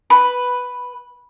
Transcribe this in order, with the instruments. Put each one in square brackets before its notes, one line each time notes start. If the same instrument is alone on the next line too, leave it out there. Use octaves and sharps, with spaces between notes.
[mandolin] B4